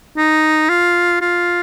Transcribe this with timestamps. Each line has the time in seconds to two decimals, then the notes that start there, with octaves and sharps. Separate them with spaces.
0.17 D#4
0.69 F4
1.21 F4